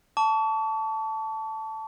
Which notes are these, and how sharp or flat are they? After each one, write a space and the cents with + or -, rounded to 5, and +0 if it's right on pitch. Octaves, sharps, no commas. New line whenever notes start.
A5 +0 C#6 +40